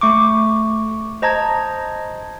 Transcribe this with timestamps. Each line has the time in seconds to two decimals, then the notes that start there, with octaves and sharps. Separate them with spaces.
0.01 A3 C#6 D6
1.22 C5 D#5 A5 A#5 G#6